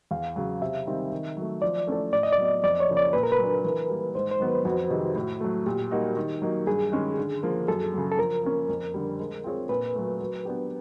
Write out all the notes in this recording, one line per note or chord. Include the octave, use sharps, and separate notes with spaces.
E2 F5
C#3 F#3
C3 E5
D#3 G3 C4
D#3
F#3 A3
F3 D5
A3 C#4 E4 A4
A2 D5
D#5
D5
F#3 B3
F2 D5
C#5
C#3 F3 A#3
D5
A#2 B4
A#4
B4
F#3 A#3 D4
E3
G3 A#3
G#2 C5
C5
D#3 F#3 B3
B4
F2 F#4
C3 D#3 G#3
A2
F#3 A3
A#2 G4
G3 A#3 D#4 F#4
D#3
F#3 A#3 D#4
G2 G#4
D#3 G#3 C#4
D3
F3 A#3
F#2 A4
C#3 F#3
A4
F3 A#4
A#3 C#4
F2
D3 G3
G#3
C4 F4 G#4 C#5
A#2 B4
F#3 A3
F#3
B3 D4 G4